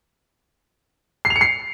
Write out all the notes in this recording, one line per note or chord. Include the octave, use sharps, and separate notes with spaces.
C7
F7
C#7
C7